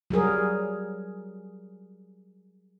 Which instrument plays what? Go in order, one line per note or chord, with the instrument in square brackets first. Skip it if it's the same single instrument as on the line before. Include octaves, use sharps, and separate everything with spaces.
[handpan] F#3 G3 G#4 A#4